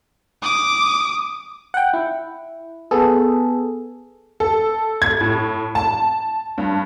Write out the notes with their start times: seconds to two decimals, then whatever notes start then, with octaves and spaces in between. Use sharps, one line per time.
0.43 D6 D#6
1.74 F#5 G5
1.93 E4
2.91 B3 G#4 A4
4.40 A4
5.02 G#6
5.21 A2
5.75 A5
6.58 G2